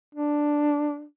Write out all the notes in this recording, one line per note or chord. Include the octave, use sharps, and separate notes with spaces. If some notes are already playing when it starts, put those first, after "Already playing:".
D4